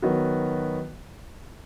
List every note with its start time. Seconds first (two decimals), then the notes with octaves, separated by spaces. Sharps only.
0.02 D#3 F#3 B3 F#4